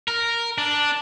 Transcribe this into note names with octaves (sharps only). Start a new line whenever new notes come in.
A#4
D4